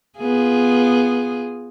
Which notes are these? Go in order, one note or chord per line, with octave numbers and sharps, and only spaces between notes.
B3 F4 G#4